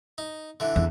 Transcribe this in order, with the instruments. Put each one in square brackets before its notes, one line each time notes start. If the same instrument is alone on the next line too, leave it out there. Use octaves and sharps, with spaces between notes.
[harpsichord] D#4
D3 E3
[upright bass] E2